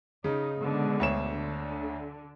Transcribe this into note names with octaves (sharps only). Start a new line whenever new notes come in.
C#3 D#4
B2 D3 G#3
D2 C#5 E7
D3